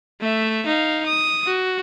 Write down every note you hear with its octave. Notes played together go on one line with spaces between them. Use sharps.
A3 E5
D#4 F5
D#6
F#4